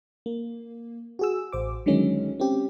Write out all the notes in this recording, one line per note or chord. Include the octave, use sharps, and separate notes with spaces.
A#3
F#4 G#4 E6
A1 C5 D6
D3 D#3 F#3 G#3 C#4
C4 C#4 G4